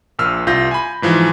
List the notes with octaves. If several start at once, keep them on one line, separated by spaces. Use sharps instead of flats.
A#1 A#2 E6 F6
C2 F4 G6 A#6
G#5 B5
G#2 E3 F3